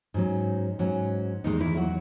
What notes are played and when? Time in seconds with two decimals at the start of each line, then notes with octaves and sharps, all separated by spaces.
0.14 G#2 F#3 C#4 D#4
0.79 G#2 F#3 C#4
1.44 E2 D#3 G#3 D#4
1.60 E3 E4
1.77 F#3 F#4